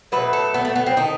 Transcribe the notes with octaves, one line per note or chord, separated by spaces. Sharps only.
B2 F#3 A3 B4
A4
B3
A3
B3
C4
D#3 A3 D#4